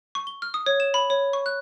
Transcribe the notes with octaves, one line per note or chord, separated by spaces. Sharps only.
C#6
G7
F6
D#6
C#5
E7
B5
C#5
C#6
F#6